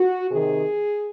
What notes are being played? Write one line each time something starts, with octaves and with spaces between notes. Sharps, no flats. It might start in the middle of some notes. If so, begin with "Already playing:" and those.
Already playing: F#4
C3 D#3 G#4